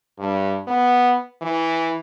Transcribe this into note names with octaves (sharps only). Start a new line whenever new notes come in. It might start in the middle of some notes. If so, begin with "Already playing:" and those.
G2
B3
E3